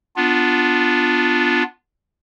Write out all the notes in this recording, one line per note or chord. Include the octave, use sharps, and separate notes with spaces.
B3 D4 F4